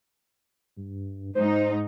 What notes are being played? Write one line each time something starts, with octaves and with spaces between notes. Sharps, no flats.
G2
G#2 D#4 C5